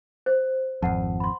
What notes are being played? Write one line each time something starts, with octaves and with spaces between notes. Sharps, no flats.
C5
G#1 F2 F#5 A5
B5 C6